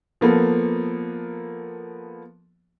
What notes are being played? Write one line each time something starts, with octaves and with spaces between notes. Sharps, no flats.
F3 A#3 B3 A4